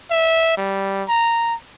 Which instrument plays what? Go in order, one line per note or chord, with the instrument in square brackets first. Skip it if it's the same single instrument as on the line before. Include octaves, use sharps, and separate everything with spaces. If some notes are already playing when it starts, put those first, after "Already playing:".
[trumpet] E5
G3
A#5